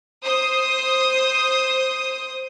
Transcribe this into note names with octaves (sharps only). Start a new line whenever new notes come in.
C5 D#6